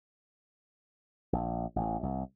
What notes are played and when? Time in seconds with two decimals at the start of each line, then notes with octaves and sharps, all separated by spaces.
1.33 A#1
1.76 A1
2.03 C2